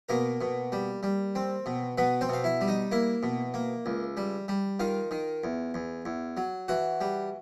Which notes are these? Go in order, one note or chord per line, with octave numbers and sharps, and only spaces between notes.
B2 A#3 A#4
B2
G3
G3
C4
B2
B2 B3 B4
C4 C5
B2 F5
E4 E5
G3
D#4 D#5
A#3 E4 E5
B2
A#3
C#2
G3
G3
D#3 F4 F5
D#3
E2
E2
E2
F#3
E3 F#4 F#5
G3